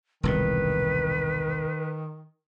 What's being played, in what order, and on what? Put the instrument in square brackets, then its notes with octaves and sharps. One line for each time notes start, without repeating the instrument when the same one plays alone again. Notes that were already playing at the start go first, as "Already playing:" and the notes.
[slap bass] E1 C2 A2 [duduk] D#3 [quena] B4